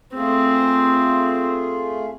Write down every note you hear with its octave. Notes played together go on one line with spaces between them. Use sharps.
A3 C4 F4 G#4